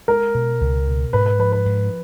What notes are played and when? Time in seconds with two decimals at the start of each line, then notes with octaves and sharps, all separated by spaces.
0.08 G#3 A#4
0.35 B2
0.61 C#2
0.87 B2
1.13 G#2 B4
1.26 B4
1.39 F3 B4
1.52 B4
1.66 G#2